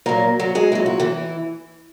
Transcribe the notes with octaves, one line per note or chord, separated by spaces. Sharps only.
A#2 F#3 A#3 A#4
F#3 F#4
G#3 G#4
A#2 F#3 E4
F#4
E3 E4